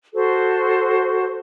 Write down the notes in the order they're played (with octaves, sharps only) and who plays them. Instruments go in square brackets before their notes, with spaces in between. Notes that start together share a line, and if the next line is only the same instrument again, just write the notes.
[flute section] F#4 A4 C5